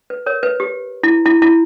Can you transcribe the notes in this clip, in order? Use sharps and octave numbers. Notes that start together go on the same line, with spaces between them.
B4
A#4 C#5
B4
G4
E4
E4
E4